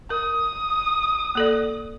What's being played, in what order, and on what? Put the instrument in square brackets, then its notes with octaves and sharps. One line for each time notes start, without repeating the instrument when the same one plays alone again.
[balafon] A#4 [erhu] D#6
[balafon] A#3 A4 D5